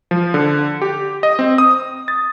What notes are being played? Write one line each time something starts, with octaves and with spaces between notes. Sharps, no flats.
F3
D3
G4
D#5
C4
D#6
A6